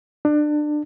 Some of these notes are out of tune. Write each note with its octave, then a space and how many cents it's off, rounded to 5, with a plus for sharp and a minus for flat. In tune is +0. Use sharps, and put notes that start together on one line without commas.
D4 +25